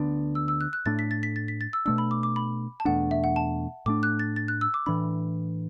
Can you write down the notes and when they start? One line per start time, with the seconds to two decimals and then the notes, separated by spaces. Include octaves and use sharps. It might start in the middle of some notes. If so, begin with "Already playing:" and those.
Already playing: D2 D3 B3 D4
0.35 E6
0.48 E6
0.61 F#6
0.73 F#6
0.86 A2 A3 D4 A6
0.99 B6
1.11 A6
1.23 B6
1.36 A6
1.48 B6
1.61 A6
1.73 E6
1.86 B2 A3 D4 E6
1.98 B5
2.11 D6
2.23 D6
2.36 B5
2.80 A5
2.85 E2 B2 A3 D4 F#5
3.11 E5
3.24 F#5
3.36 A5
3.86 A2 A3 D4 D6
4.03 F#6
4.19 A6
4.36 A6
4.48 F#6
4.61 E6
4.74 D6
4.86 A2 E3 D4 B5